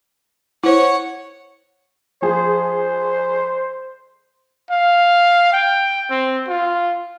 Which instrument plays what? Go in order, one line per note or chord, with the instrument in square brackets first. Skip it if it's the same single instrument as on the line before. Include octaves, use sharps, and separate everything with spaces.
[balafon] E4 C5 [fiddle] C#5 F#5
[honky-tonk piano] F3 G#4 [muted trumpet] C5
[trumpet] F5
G5
C4
F4